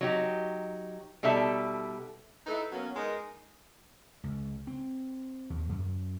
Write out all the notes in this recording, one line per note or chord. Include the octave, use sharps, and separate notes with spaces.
F#3 D#4 G4
B2 G3 D#4 A4 E5 A5
D#4 E4 A4 B4
F#3 A#3 B3 C#4
G#3 D#4 A#4
C#2
C4
D#2
F#2